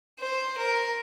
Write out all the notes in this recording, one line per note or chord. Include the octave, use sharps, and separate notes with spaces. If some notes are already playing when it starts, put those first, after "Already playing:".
C5
A#4